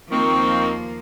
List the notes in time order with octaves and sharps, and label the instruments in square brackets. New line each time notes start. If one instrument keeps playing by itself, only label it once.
[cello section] D#2 F3 A#3 [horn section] D#3 C4 [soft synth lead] C#6